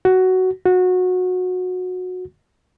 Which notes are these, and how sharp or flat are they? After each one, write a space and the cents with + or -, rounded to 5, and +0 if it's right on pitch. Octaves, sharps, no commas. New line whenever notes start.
F#4 +10
F#4 -20